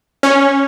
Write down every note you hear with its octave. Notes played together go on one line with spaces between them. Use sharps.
C#4